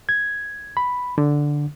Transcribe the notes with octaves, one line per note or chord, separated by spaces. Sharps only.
G#6
B5
D3